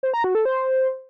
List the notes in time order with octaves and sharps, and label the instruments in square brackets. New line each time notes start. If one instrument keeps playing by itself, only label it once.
[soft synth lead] C5
A#5
F#4
A4
C5